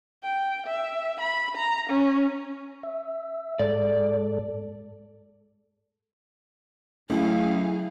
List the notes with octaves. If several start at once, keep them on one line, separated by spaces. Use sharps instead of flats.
G5
E5
B5
A#5
C#4
E5
G#2 G#3 A4 D5
C#2 F#3 A3 E4 G#4 F5